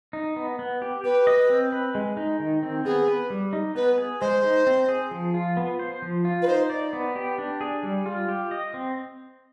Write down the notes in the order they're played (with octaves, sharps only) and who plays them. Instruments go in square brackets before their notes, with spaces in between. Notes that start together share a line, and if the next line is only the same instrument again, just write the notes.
[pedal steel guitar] D#4
B3
B3
G4
[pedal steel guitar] G4 [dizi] B4
[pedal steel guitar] D#5
C4
B4
G#3
D#4
D#3
C4
[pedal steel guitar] B3 [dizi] G#4
[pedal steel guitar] B4
G3
D#4
[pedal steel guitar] B3 [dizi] B4
[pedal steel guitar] G#4
[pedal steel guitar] G#3 [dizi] C5
[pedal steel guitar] D#4
C4
G#4
F3
F4
B3
C5
F3
F4
[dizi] B4
[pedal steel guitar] D#4 [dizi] C5
[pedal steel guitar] D5
B3
G4
D4
G#4
G3
F4
G4
D#5
C4